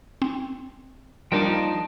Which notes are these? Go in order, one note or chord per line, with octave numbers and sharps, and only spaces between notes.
C4
F3 G3 A#3 D4 D#4 G5 A5